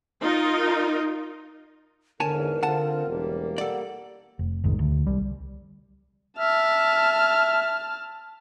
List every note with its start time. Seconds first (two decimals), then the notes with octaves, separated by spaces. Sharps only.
0.23 D#4 F4 A#4 D#5
2.20 E2 G#2 D3 A#4 C#5 G#5 A5
2.63 D3 C4 F4 F#5 A5
3.07 E1 G3 A#3
3.58 A4 D5 F#5
4.39 F1
4.64 F1 A#1 G#2 D#3
4.79 D2
5.07 C2 G3
6.39 E5 A5 F6